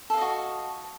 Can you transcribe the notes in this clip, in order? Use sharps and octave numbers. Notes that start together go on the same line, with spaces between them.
F#4 A4 D#5 F5